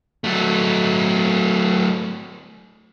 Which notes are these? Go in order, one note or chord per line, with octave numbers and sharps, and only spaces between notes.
F#3 A3